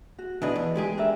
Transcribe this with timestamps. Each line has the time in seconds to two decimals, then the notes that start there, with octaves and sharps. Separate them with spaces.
0.18 F#4
0.42 B2 D4 E4 B4 D#5
0.56 E2
0.76 G#3 G4 G#4
0.98 D4 A#4 E5